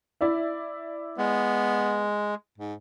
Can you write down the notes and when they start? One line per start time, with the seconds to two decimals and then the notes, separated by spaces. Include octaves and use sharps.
0.21 E4 D5 E5
1.18 G#3 B3
2.58 G#2